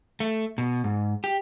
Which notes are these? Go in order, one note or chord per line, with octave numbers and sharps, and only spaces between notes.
A3
B2
G#2
G4